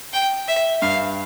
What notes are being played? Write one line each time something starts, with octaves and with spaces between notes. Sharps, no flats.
G5
E5
G2 F5